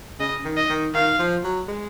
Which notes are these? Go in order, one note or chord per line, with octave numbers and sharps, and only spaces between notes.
C#3 D#5
D#3
D#5
D#3
D#3 F5
F3
F#3
G#3